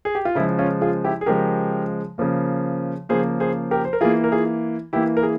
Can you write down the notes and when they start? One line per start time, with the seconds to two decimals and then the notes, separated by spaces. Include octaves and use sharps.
0.05 G#4
0.15 G4
0.25 F4
0.35 C#3 F3 G#3 E4
0.59 C#4 F4
0.81 F4 G#4
1.04 E4 G4
1.21 G#4
1.26 C#3 F3 G#3 G4 A#4
2.18 C#3 F3 A#3
3.09 C#3 F3 A#3 G#4 C5
3.40 G#4 C5
3.71 G4 A#4
3.85 C5
3.93 A#4
4.01 E3 A#3 F4 G#4
4.24 A#4
4.32 F4 G#4
4.93 E3 A#3 E4 G4
5.17 A#4
5.23 G#4